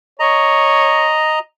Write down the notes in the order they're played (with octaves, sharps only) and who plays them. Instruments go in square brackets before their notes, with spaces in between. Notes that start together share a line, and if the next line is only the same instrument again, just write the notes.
[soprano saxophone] C#5 [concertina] D#5 A#5